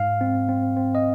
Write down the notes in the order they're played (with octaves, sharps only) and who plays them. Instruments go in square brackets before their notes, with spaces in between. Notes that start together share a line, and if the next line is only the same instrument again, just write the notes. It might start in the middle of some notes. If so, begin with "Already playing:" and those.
Already playing: [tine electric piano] G#2 F5
C4
C4
C4
D#5